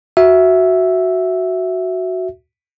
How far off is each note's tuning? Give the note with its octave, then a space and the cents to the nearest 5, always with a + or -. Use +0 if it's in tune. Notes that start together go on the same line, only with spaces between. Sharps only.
F#4 +0 E5 +0